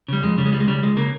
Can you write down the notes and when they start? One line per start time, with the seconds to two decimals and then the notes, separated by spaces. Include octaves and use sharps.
0.08 C#3 G3
0.22 F2 G#3
0.38 C#3 G3
0.46 G#3
0.52 C#2 G3
0.60 G#3
0.68 C#3 G3
0.83 C#2 G#3
0.97 C#3 A#3